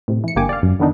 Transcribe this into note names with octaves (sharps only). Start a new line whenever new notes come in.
A2 C3
E3 C#7
G1 D3 A#3 G4 G#5 D6
D5 F5
F#2
D3 D#3 B3 D4 D#4